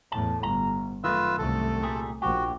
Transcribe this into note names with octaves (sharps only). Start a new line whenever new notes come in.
E2 A2 A5
G1 A#5
F#2 D#3 A3 F4 B4 E6
C2 A3 A4
A#2 G3 G#4
A#1 F#4 G4